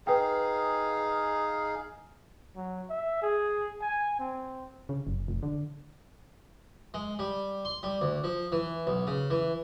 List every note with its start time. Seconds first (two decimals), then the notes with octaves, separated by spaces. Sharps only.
0.07 D#4 G#4 B4 F5 G5
2.56 F#3
2.90 E5
3.22 G#4
3.81 G#5
4.20 C4
4.89 C#3
5.07 F#1
5.28 F1
5.43 D3
6.94 G#3
7.19 G3
7.65 C6
7.83 G3
8.01 D2
8.24 F3
8.52 E3
8.87 B1
9.07 C#3
9.30 E3